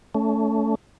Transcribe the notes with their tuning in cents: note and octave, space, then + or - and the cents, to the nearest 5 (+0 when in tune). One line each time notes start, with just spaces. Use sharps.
A3 +0 C#4 +25